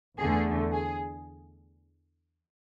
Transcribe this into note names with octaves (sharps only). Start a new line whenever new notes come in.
E2 D3 A3 G#4
G#4